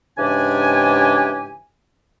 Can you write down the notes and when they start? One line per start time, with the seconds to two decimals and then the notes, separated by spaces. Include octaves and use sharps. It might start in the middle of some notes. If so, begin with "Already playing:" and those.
0.17 G#2 C#3 E3 D4 G4 G#5